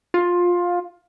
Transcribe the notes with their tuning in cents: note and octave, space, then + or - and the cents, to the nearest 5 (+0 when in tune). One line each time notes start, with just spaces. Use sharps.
F4 +15